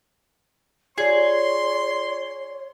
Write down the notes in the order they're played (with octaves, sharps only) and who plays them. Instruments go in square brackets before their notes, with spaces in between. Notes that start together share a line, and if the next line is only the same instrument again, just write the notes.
[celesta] F4 D5 [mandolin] G#4 [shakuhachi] C#5 [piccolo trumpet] C6